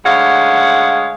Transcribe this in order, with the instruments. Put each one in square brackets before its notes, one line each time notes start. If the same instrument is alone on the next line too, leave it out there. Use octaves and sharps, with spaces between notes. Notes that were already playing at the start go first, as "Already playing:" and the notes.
[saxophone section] D2 G#3 C#5 F5 F#5